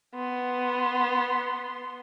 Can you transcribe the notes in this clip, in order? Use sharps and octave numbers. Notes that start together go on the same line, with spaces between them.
B3 C6